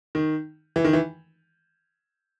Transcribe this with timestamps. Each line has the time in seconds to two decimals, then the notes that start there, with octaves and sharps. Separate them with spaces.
0.15 D#3
0.76 E3
0.85 D#3
0.93 E3